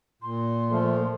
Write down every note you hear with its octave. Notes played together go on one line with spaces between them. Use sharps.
A#2 C6
F3 A3